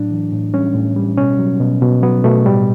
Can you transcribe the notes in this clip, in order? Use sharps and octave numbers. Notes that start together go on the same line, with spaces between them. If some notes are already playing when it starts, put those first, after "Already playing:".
Already playing: A2 F#3 D4
E3
A2
G3 C#4
A2
G3
B2 C#4
F#3
B2
B2
F#3 B3
B2 A3
A2 G3